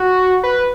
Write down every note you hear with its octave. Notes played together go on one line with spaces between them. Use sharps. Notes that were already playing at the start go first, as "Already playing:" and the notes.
Already playing: F#4
B4